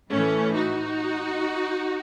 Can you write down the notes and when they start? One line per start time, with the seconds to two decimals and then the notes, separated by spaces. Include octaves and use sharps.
0.10 A2 E3 A3 C#4
0.55 D#4 F#4